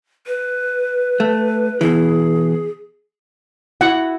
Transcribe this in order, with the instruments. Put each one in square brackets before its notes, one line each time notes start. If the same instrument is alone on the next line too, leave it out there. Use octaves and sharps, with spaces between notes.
[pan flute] B4
[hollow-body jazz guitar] A3
[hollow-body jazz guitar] B2 E3 [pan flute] G#4
[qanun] E4 F#4 [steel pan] F#5